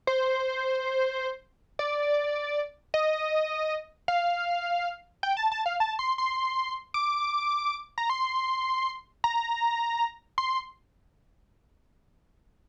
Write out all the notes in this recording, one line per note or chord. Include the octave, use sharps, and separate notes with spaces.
C5
D5
D#5
F5
G5
A5
A5
F5
A5
C6
C6
D6
A#5
C6
A#5
C6